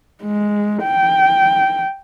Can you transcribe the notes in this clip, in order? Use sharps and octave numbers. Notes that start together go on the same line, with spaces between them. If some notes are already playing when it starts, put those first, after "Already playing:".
G#3
G5